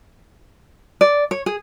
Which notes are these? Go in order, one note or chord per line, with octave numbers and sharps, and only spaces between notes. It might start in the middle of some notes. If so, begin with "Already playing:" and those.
D5
C#5
G#4